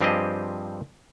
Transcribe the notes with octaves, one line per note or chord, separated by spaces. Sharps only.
G2 F3 C4 G4 G#4 D#5